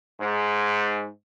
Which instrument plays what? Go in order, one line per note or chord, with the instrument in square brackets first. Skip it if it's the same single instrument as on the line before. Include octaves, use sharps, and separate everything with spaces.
[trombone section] G#2